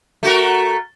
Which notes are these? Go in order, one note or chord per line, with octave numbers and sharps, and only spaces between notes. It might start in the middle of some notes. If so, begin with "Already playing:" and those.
A3 F#4 A#4